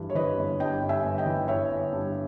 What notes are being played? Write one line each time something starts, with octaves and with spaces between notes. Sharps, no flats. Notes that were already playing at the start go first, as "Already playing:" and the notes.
Already playing: G2 E3
C#5
E3 B4 D#5
G1
G2 D#5 G5
G2
E5 G#5
G1
D#5 G5
E3
G1 C#5 E5
G1
G2